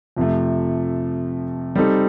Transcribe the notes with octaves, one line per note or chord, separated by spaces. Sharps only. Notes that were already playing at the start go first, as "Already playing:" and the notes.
F2 C3 F3 A3
G3 C4 D#4 A4